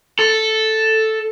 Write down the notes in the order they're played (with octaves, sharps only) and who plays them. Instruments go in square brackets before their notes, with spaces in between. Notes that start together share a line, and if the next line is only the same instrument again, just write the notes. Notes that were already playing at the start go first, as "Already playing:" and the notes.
[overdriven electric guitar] A4